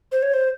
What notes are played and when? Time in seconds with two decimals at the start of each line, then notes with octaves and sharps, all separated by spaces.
0.12 C5
0.22 C#5
0.34 C5